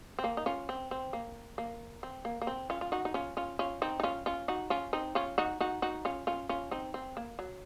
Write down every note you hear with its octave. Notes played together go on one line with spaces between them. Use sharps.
C4
A#3
D#4
C#4 F4
C4
C4
A#3
A#3
C4
A#3
A#3
C4
C#4 F4
F4
D#4 F#4
D#4
C#4 F4
C#4 F4
C#4 F4
C4 D#4
D#4
C#4 F4
C#4 F4
D#4 F#4
C#4 F4
C4 D#4
C#4 F4
D#4 F#4
D#4 F#4
D#4 F#4
C#4 F4
C#4 F4
C#4 F4
C4 D#4
C4
A#3
F#3